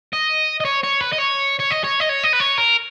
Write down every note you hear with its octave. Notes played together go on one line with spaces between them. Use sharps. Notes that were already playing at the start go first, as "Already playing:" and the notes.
D#5
D#5
C#5
C#5
B4
D#5
C#5
C#5
D#5
C#5
D#5
C#5
D#5
B4
C#5
A#4